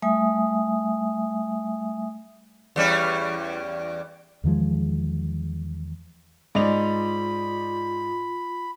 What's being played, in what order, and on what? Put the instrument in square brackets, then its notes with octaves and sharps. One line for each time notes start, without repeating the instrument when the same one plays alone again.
[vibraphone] G3 A3 E5 G#5 D#6
[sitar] E2 G3 C#4
[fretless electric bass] E2 D#3 F3 G#3
[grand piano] G#2 [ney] F4 [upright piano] D5 D#5 F7 [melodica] B5